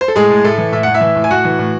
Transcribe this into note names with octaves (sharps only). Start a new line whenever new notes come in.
C5
A4
A2 G#3 G#4
A2
A2 A3 A4
E3
A2 E5
A2 F#5
E4 E5
E3
A2
G#5
A2 F#4 F#5
E3
A2